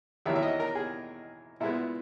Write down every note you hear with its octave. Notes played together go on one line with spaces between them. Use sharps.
E2 D#3 F#3 A#3 E5
E5
D#5
A#4
G#4
A#2 G#3 B3 E4